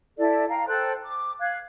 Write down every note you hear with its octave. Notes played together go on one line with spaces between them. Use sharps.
E4 A4 D5
F5 G5 A#5
A4 C5 G5 F#6
D6
F5 F#6 G#6